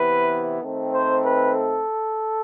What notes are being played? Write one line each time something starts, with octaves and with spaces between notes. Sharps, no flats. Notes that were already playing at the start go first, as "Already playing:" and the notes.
Already playing: C3 E3 B3 B4
D#3 A3 C4
C5
B4
A4